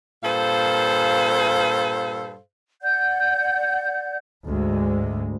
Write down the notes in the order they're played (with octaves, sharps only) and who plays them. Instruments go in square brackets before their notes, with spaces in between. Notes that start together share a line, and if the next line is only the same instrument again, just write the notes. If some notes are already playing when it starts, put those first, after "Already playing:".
[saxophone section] G2 A#2 A4 C5 F5
[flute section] D5 F#5 G6
[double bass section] D2 G#2 G#3